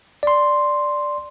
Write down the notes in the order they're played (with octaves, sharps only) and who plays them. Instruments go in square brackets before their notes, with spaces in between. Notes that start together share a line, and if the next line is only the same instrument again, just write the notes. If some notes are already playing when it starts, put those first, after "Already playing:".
[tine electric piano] D5 C6